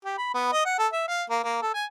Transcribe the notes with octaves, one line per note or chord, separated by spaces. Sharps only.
G4
B5
B3
D#5
F#5
A4
E5
F5
A#3
A#3
A4
G#5